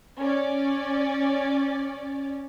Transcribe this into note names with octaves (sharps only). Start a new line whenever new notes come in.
C#4 D5